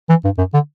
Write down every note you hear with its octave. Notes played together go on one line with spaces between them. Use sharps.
E3
G2
F#2
D3